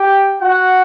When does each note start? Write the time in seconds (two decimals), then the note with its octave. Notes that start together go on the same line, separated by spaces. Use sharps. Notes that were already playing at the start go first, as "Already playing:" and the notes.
Already playing: G4 G5
0.41 F#4 F#5